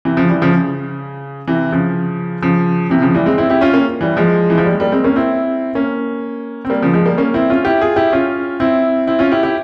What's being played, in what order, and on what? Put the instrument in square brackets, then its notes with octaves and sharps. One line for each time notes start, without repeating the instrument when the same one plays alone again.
[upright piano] C3 E3
C#3 F3
E3 G3
C#3 F3
C#3
C3 E3
C#3 F3
C#3 F3
C3 E3
C#3 F3
E3 G3
G#3 C4
C4 E4
E4 G4
C#4 F4
A#3 C#4
E3 G3
F3 G#3
E3
F3
G3
G#3
G3 A#3
G#3 C4
A#3 C#4
C4 E4
A#3 C#4
C4
G3 A#3
C#3 F3
F3 G#3
G3 A#3
A#3 C#4
C4 E4
C#4 F4
E4 G4
F4 G#4
E4 G4
C#4 F4
C4 E4
C4 E4
C#4 F4
E4 G4
E4 G4